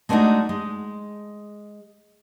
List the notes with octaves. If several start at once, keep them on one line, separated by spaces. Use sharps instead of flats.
G#3 A3 B3 D4 D#4 F#4
G#3